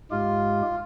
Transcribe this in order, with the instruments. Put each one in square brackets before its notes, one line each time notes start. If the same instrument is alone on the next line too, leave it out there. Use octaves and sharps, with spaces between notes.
[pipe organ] G#2 G#3 G4 [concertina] F4